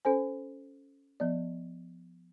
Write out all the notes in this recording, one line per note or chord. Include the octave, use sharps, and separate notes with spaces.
C#4 A4 C5 G#5
F3 B3 D5